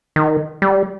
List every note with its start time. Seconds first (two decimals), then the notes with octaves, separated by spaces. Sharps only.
0.16 D#3
0.62 G3